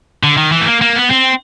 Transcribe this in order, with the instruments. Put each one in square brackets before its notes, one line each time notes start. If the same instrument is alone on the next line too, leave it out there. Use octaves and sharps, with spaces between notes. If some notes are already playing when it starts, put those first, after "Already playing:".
[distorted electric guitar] D3
D#3
E3
A3
A#3
A#3
B3
C4